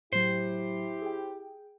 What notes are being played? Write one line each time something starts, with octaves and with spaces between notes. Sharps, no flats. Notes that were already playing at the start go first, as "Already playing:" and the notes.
A2 F#3 E4 G4 C5
G#4 G5